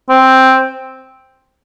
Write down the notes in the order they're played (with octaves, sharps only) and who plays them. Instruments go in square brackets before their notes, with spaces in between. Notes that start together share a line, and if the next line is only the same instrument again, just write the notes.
[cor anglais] C4